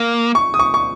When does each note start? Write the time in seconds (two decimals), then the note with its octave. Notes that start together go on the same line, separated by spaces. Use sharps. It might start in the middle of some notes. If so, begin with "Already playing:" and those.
Already playing: A#3
0.35 C#6
0.54 D#6
0.59 C#6
0.74 C#6